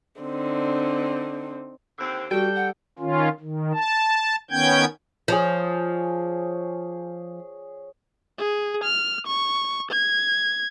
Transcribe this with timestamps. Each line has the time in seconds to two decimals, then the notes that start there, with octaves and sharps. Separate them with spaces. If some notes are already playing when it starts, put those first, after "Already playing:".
0.21 D3 C4 D#4
1.98 D#2 D3 C4
2.31 G3 F#4 A4 G5
2.56 F#5
2.99 D#3 C#4 F4
3.40 D#3
3.73 A5
4.51 D#3 B3 C#4 G5 G6 G#6
5.28 F3 G#4 C#5 D5
8.39 G#4
8.84 F6
9.27 C#6
9.91 G#6